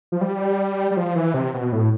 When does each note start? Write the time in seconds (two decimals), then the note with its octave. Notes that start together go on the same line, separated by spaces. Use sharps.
0.12 F3
0.21 G3
0.91 G3
0.97 F3
1.16 E3
1.34 C3
1.54 B2
1.72 A2